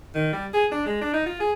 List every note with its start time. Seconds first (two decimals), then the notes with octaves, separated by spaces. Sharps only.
0.15 D#3
0.33 G3
0.54 G#4
0.72 D4
0.86 G#3
1.01 D4
1.14 D#4
1.26 F4
1.40 G#4